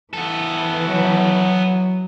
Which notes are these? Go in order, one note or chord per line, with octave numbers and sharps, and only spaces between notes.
E3 B3 A4
F#3